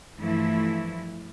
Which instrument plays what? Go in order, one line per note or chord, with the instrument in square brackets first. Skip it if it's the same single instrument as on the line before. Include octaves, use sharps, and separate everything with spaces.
[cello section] G2 E3 F3 A3 E4